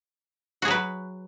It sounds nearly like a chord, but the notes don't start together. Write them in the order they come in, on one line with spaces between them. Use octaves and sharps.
F#4 G#4 F#3 B4